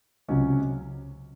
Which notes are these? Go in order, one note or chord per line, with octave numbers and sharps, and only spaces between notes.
C#2 C3 F#3 C#4